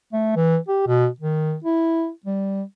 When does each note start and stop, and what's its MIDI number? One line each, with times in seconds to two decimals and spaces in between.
0.13 0.34 57
0.36 0.58 52
0.68 0.84 67
0.87 1.08 47
1.20 1.55 51
1.64 2.09 64
2.26 2.63 55